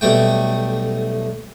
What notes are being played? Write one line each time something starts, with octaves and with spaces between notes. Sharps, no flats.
B1 G3 A3 G5